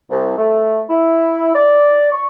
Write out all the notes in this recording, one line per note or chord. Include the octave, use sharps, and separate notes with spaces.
C2
A3
E4
D5
C#6